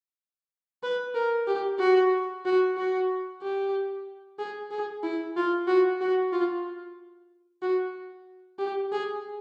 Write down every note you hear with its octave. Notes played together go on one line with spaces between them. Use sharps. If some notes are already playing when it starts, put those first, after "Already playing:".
B4
A#4
G4
F#4
F#4
F#4
G4
G#4
G#4
E4
F4
F#4
F#4
F4
F#4
G4
G#4